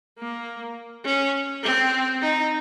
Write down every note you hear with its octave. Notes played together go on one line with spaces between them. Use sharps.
A#3
C#4
C4
D#4